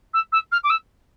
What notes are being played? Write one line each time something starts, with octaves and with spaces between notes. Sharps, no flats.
E6
E6
F6
D6
E6